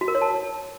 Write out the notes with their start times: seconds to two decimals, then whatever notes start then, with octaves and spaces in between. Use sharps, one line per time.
0.01 F#4
0.08 A#4
0.15 C#5
0.22 A5